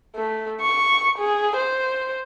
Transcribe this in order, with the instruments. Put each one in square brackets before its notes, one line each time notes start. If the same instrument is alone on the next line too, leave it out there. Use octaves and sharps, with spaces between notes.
[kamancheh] A3
C#6
G#4
C5